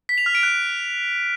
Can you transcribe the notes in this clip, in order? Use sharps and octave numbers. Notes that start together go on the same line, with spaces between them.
B6
F7
F6
D7
F#6